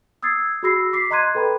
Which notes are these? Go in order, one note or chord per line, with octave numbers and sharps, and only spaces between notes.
D#6 E6 G#6 A6 C7
F#4 G#4 B5 E6 A#6 C7
D6 B6 C7
D#5 A#5 C6 F#6 G#6 D#7
A4 B4 G5 B5